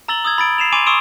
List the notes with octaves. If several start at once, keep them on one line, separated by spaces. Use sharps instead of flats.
A#5 E6 A6 F#7 G7
D#6 E6 G#6
B5 A6 D7
C7 E7 F7
G#5 C6 D6 D7 D#7 F7
C6 C#6 D#6 E6 D7 E7